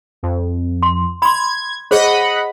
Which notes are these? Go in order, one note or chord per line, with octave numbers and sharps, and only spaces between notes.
F2
C6
B5 C6 G#6
G#4 C5 C#5 D#5 F#5 B5